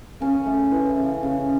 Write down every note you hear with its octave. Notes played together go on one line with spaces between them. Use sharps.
C#3 C#4
A3
E3
C#3
C#3